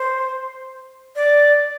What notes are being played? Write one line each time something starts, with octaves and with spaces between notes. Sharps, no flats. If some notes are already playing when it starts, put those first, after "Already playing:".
Already playing: C5
D5